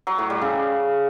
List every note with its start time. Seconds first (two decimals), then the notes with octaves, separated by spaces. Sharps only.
0.07 F#3
0.18 A2
0.30 G3
0.41 C#3